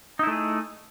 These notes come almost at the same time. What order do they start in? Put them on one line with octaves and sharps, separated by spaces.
D#4 E4 A3 G#4